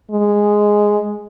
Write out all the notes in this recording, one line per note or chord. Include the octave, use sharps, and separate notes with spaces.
G#3